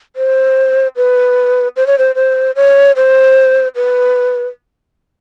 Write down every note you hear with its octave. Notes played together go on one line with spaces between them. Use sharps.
C5
B4
C5
C#5
C5
C5
C#5
C5
B4